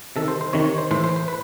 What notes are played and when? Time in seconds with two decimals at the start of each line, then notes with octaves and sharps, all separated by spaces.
0.16 C3 D#3 A4
0.28 C5
0.41 C5
0.53 C3 D#3 C#5
0.66 C#5
0.78 C5
0.91 A2 E3 C5
1.04 C5
1.16 C5
1.28 B4